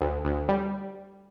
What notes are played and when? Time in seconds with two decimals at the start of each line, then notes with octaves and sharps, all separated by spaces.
0.01 D2
0.25 D2
0.49 G3